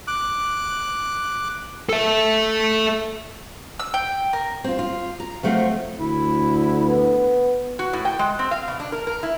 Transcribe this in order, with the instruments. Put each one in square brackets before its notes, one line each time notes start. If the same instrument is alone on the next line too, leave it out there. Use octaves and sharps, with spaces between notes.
[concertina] D6 F#6
[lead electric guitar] A4 E5
[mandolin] E6
G5
A#4
[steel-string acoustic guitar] C4 F4
F4
A#5
F3 F#3 A3 C4 F4
[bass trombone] D2 [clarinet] E4
[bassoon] B3
[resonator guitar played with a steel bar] F#4
A2
G5
G#3
C4
F5
B2
D4
A#4
A#4
E4